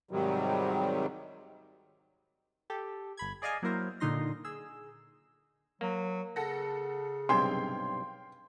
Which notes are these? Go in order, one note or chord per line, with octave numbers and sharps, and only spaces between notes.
G#2 C3 D#3 F#3 G3
G4 A4
G1 B5 G#6
G#4 D5 D#5 F5 G#5
F#3 A#3 E4 A#4 C5
A#2 D3 D#4 C6 A#6
G#4 E6
F#3 A#3
C#3 A4 F#5 A#6
B1 G2 C3 F5 G5 C6 G#6